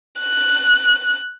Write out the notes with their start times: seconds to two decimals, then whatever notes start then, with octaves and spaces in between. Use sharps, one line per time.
0.20 F#6